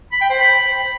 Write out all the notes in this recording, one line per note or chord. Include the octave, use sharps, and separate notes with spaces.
B5
G5
C5
B5